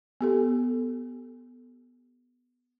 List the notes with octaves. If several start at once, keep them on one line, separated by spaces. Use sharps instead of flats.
B3 G4 A4